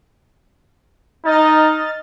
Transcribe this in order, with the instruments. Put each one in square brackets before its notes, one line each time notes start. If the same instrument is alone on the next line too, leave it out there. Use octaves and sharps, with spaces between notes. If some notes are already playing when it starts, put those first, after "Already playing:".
[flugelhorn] D#4 [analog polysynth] D#5 F6 A6